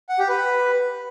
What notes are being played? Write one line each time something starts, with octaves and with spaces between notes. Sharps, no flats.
F#5
G4
B4